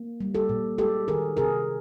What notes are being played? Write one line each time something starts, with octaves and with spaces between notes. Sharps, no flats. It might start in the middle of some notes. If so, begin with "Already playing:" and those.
Already playing: A#3
G3
G4 A4
A#2
G#3 G4 A4
D#3 G#4 A#4
C3 G#4 A#4